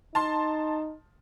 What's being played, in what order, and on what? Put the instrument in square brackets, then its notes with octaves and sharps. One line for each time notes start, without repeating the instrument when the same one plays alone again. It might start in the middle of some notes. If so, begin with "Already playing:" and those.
[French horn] D#4 [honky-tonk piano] A5 C6